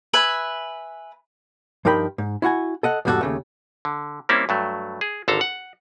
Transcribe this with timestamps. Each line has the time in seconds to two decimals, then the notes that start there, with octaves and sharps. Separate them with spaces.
0.14 B4 E5 G#5
1.85 G2 F3 D#4 A#4 G5 B5
2.18 G#2
2.42 E4 F#4 F#5 G#5
2.83 A4 D#5 F#5
3.05 E2 G#2 G3 C#4 F#4 A4
3.21 D#2 C#3 A3
3.85 D3
4.29 G3 A#3 C4 C#4 E4
4.49 G2 F#3 A3
5.01 G#4
5.28 G#1 D3 A4 F5 A#5
5.41 F#5